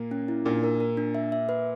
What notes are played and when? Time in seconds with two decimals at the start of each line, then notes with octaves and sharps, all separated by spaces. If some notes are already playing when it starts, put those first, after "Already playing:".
Already playing: A#2 A#3
0.11 C#4
0.28 E4
0.45 A#2 A#3 D4
0.64 A#4
0.80 A#4
0.97 D4
1.15 E5
1.32 E5
1.49 B4